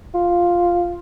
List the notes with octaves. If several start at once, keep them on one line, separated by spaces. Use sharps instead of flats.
F4